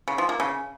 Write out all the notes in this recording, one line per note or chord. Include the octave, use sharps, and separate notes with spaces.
C#3
F3
A#3
C#3